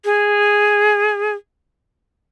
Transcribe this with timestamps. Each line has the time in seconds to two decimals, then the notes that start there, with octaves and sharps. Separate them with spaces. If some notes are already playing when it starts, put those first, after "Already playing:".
0.05 G#4